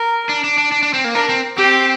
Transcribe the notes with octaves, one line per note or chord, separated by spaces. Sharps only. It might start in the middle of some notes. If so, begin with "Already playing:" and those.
Already playing: A#4
D4
D4
D4
D4
D4
C4
A#3
D4 A#4
C4
C4 G4